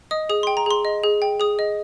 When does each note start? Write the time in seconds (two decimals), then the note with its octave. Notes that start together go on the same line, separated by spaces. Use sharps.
0.11 D#5 D#6
0.29 G#4 D#6
0.43 G5 C6
0.57 A#5
0.66 G#4 C6
0.85 D#5
1.03 G#4
1.22 G5
1.40 G#4 D#6
1.59 D#5